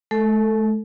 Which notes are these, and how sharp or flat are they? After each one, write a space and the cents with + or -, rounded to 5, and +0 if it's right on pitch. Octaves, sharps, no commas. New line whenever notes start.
A3 -40 A4 +10